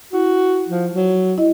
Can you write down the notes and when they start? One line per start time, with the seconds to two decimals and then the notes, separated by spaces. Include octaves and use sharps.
0.13 E4 F#4
0.68 F3
0.94 F#3
1.38 E4 D#5